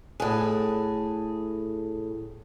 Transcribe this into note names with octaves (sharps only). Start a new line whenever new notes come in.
A2 G#4